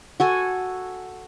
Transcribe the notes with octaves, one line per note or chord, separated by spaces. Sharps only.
F#4 A4 G#5